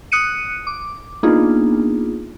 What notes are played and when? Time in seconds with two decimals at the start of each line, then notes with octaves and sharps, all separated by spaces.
0.12 D#6 F#6 C#7 D#7
0.67 D6
1.23 A#3 B3 D4 D#4 F4 G#4